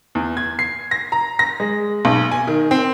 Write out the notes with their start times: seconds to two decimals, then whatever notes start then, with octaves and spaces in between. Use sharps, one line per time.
0.15 E2
0.37 G#6
0.59 C7
0.91 A#6
1.12 A#5
1.39 A#6
1.60 G#3
2.05 B1
2.31 G#5
2.47 D#3
2.71 C4